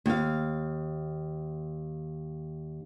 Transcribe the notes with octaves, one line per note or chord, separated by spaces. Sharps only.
D#2 F5